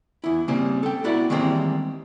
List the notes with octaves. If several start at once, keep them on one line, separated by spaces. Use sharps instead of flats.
E2 E4
C#3 G3 A#3 C4
A4 G5
B3 E4 F#4 D5
D#3 E3 G3 G#3 A#3 C4